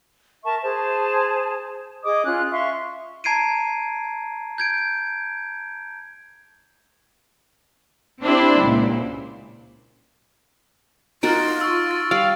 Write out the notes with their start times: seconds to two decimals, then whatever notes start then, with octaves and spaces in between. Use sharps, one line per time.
0.44 A#4 E5 A5 C#6
0.62 G#4 C5 A5
2.04 G#4 D#5 D6 D#6
2.26 C#4 F4 F#6
2.52 E5 F5 C6 C#6
3.24 A5 A#5 G#6 C7 D7 D#7
4.58 G6 G#6 D7
8.23 C4 D4 E4 G4 C5 D5
8.62 C#2 A#2
11.23 D#4 F4 F#4 A#4 F6 A6 D7
11.61 C#6 E6
11.91 A6
12.11 G3 D5 F5